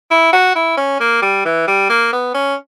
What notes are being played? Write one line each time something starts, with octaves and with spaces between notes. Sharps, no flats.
E4
F#4
E4
C#4
A#3
G3
E3
G3
A#3
B3
C#4